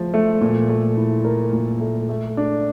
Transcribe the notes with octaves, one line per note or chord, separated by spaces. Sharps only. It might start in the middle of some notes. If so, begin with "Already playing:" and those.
Already playing: F3 A3 F4
A3
A#2
A3
E4
A#4
A#2
A3
A3
D4